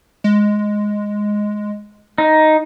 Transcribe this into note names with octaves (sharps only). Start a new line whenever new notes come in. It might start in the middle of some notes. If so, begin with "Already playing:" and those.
G#3
D#4